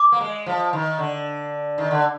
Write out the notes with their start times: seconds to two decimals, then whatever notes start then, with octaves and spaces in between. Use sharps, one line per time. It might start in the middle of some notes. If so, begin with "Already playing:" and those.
Already playing: D6
0.12 A#3
0.21 G#3
0.46 F3
0.73 D#3
0.98 D3
1.78 D#3
1.91 D3